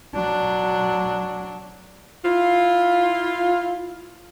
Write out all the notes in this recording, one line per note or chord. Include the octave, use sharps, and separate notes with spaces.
F#3 D4
E4 F4